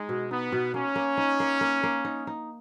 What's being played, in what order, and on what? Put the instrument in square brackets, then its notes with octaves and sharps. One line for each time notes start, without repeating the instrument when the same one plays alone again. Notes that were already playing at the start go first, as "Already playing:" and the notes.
Already playing: [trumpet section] G#3 [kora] D#4
[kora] B2
[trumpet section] B3 [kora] D#4
[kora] B2
[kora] A#3 [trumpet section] C#4
[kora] A#3
D#4
A#3
A#3
A#3
D#4
D#4